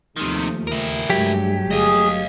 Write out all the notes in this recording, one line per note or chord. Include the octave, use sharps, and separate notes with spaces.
D#2 C3 D#3 F3 A3
E4 A#4
G2 F#3 G#3 A3 G4
G1 A3 G#4 D#5 F5